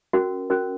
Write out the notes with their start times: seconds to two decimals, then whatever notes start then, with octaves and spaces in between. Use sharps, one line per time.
0.13 C#4 F#4 A#4
0.50 C#4 F#4 A#4